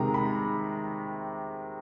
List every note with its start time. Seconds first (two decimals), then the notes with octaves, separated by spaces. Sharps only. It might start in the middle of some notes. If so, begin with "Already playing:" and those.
Already playing: C3 D#3 G#3 A#5
0.14 B5